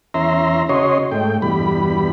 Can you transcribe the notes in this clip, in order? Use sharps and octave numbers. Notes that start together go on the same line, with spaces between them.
E2 C#4 E5 A#5 C6
C#3 C#4 F#4 C#5 D#5 C6
G#2 A3 G5
E2 G2 B2 G3 B5